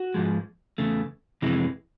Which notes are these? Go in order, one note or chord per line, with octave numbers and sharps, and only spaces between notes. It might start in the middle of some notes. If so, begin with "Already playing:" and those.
Already playing: F#4
G#2 F3 G#3
E2 C#3 A3
F2 C3 E3 G#3